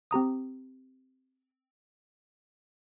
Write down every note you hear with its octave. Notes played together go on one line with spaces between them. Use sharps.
C4 G4 A#5 D#6